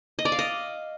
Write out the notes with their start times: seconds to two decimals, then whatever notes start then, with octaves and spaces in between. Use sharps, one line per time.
0.19 D#5
0.25 D5
0.32 F5
0.39 D#5